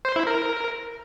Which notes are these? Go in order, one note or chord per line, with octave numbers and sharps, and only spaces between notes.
C5
E4
A#4